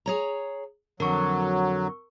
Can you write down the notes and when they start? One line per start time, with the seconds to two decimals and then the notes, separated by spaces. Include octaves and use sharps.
0.06 G#4 C#5 A#5
1.00 F2 D3 F#3 A#4 C#6